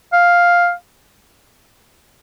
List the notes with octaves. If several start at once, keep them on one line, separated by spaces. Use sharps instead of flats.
F5